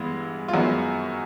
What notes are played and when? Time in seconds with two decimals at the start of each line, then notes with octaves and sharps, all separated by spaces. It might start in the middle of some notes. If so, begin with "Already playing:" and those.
Already playing: G2 E3 G#3 B3
0.48 F4
0.53 F#2 D#3 G#3 B3 F#4